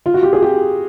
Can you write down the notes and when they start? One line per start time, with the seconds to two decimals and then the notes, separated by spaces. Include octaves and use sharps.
0.06 F4
0.14 F#4
0.23 G4
0.33 G#4
0.42 G4